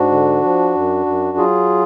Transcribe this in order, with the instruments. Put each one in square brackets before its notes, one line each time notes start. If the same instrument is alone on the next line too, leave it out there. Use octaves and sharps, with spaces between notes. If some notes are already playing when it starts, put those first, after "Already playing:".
Already playing: [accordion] G#2 D4 F#4
D3
F3
F#2
F#2
F#3 F4 G#4